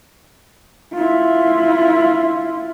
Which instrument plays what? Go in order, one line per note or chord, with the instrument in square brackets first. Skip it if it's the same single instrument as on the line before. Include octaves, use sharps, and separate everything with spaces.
[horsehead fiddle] E4 F4